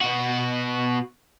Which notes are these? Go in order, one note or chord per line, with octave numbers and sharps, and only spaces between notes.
B2 F#4